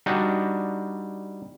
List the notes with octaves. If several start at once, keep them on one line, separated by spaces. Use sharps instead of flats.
G3 D4 D#4 F#4